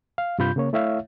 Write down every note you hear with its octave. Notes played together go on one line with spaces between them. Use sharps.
F5
G2 C3 F4 B5 G6
C#3 A#3 C#5
A3 E4 C#5 E5 F5